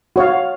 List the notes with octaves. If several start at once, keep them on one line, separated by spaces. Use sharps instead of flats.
F#4 C#5 F5